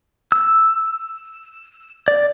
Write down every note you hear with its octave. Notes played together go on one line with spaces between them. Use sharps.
E6
D5